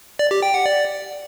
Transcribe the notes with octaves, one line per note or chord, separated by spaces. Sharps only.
D5
G4
G5
F#5
D5